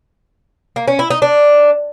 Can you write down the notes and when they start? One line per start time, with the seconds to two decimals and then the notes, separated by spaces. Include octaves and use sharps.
0.76 A#3
0.88 C#4
0.99 E4
1.10 D#4
1.22 D4